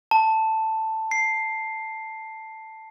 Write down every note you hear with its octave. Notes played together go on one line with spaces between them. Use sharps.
A5
C7